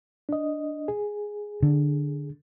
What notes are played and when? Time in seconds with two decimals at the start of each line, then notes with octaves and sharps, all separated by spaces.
0.29 D4 D#5
0.88 G#4
1.63 D3